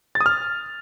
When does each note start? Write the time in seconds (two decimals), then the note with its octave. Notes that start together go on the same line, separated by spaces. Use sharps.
0.15 A6
0.21 D#6
0.26 F6